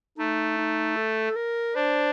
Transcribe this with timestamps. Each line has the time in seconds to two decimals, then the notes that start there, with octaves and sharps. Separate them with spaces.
0.18 A3 D#4
0.57 D#4
0.96 A4
1.36 A#4
1.75 D4 C5